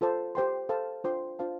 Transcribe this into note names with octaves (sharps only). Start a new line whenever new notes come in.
F4 A4 C5 A5
G4 C5 G5 C6
A4 C5 F5 A5
D4 F4 C5 G5 C6
D4 F4 C5 F5 A5